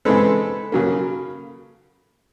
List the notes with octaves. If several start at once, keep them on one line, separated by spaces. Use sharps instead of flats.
C#3 E3 G#3 C4 A4 B4
C#3 F#3 A#3